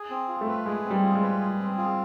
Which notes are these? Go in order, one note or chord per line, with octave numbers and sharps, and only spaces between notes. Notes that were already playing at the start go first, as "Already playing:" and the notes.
Already playing: G#4
C4
F4
A3
B4
G#3 G#4
C4
G3
F4
G#3
B4
G#4
C4
F4